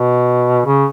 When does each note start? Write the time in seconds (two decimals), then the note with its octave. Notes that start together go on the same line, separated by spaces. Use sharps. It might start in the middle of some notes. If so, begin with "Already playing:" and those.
Already playing: B2
0.65 C#3